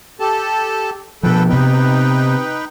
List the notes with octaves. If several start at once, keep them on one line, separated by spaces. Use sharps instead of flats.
G4 A4 A5
B2 F3 A4 B4 G5
C3 B3 D#4 B4 G5